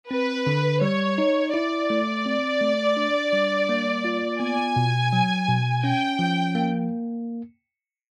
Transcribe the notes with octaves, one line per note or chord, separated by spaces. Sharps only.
C4 B4
D3
G3 C#5
D#4
E4 D5
A3
C4
A3
D4
G3
A#3
F4
B3 G#5
B2
F#3
B2
C#4 G5
F3
A#3